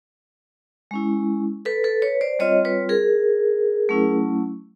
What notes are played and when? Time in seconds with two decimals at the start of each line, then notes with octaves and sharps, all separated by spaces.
0.91 G#3 C#4 E4
1.65 A4 B4
1.84 A4 B4
2.02 B4 C#5
2.21 C5 D5
2.39 G3 C4 F4 C#5 D#5
2.65 B4 C#5
2.89 G#4 A#4
3.89 F#3 A3 C#4 E4